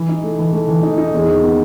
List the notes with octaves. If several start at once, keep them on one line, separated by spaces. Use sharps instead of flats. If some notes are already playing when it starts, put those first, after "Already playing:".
Already playing: E3
D#4
A3
E3
A3
E3
D#4
D#4
E2
D#3
B3